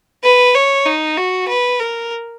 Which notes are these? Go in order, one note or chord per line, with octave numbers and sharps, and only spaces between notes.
B4
C#5
D#4
F#4
B4
A#4